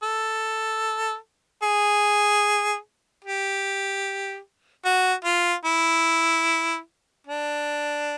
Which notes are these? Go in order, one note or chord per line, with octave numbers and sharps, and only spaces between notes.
A4
G#4
G4
F#4
F4
E4
D4